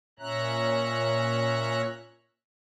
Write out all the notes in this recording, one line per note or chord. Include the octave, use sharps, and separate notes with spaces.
A#2 C#4 C#5 E5 A#5 F#6